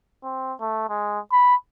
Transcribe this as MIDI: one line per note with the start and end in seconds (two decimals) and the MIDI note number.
0.24 0.53 60
0.60 0.85 57
0.89 1.19 56
1.32 1.55 83